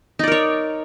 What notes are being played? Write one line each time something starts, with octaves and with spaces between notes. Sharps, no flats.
D#4 A#4 C#5 D5